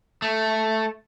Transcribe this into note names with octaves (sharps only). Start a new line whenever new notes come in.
A3